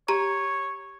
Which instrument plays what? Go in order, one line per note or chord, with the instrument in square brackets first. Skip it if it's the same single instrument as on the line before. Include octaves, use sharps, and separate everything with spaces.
[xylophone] G4 A#5 [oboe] C#5